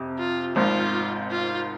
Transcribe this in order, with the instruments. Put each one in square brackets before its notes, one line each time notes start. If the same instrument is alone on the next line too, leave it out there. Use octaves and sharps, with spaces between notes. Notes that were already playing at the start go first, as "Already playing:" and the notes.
Already playing: [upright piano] F2 C3
[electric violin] F4
[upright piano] G#1 G#2 F3 [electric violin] F4
[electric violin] F4